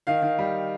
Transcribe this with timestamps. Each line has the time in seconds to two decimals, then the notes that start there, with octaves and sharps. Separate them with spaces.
0.07 D#3 F5
0.22 D#3
0.39 G3